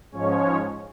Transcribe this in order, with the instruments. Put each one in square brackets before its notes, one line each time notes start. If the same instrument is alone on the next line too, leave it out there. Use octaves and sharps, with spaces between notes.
[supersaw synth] G#2 F3 G#3 C#4 C#5